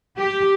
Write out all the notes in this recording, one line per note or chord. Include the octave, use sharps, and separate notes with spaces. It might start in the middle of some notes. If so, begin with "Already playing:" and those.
G4